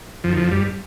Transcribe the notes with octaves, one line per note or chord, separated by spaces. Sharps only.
F2 F3
D#3
F2 F3
G2 G3